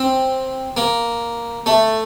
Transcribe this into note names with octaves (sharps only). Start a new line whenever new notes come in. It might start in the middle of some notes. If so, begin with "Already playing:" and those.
Already playing: C4
A#3
A3